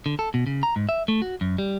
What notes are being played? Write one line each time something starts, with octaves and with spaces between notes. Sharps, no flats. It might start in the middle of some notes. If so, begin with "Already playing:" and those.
D3
A4
B2
C#3
A#5
G#2
E5
A3
F#4
F#2
G3